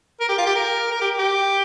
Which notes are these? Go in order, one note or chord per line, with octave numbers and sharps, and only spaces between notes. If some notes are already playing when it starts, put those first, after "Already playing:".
A#4
G4
F4
G4
A#4
A#4
G4
G4